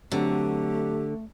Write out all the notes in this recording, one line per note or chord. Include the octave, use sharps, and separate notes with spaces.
D3 F#3 A3 C4 D4 G4